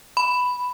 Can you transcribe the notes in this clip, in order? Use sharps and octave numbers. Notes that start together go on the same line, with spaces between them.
B5